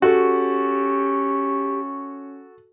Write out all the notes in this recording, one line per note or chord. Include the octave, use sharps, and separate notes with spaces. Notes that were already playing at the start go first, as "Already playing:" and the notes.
C#4 F#4 G4 A4